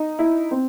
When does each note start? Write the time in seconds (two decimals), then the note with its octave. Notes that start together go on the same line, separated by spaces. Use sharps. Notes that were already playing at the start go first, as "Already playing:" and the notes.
Already playing: D#4
0.19 E4
0.51 C4